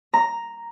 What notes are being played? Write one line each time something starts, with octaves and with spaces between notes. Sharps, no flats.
A#5